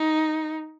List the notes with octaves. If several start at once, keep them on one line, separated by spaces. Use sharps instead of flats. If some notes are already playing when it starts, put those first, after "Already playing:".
Already playing: D#4